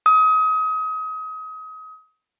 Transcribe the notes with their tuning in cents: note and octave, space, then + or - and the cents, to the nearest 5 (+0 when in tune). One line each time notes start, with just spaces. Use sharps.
D#6 +30